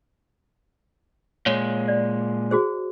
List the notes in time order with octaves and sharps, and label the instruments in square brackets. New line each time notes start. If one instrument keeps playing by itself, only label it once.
[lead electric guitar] A#2 G#3 [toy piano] C#5
[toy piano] D5
F#4 G#4 C5